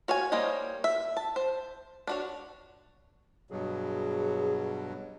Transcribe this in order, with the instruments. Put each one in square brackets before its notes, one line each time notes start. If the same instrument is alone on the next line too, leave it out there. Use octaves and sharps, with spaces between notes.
[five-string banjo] F#4 C#5 F5 G#5
G3 A#3 C5 C#5 D#5
E5
A5
C5
D4 F#4 C#5
[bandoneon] G2 B2 F#3 [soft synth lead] G#4